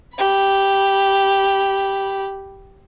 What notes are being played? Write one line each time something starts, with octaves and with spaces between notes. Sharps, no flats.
G4 B5